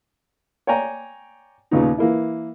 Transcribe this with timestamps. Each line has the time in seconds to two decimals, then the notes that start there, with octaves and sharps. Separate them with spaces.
0.67 C#5 D5 G5 G#5 A#5
1.71 D#2 A#2 C#3 B3 D#4
1.98 E3 A#3 E4